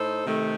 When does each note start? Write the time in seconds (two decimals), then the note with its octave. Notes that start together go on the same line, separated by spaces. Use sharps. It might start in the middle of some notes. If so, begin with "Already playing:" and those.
Already playing: A2 D#4 A4 C5
0.25 C3 D#3 A3